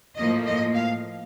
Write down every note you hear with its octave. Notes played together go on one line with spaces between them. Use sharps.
A2 F3 A#3 D#5
D#5
F5